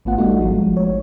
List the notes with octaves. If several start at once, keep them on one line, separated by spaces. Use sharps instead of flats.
G#1 A3 B3 F4 F#5
G3 A3 D4 D#4 F#4
G#1 F3 G#3
C#5